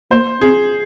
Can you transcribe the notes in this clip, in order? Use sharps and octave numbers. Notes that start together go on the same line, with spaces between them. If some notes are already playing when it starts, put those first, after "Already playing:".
A#3 C5
C4 G#4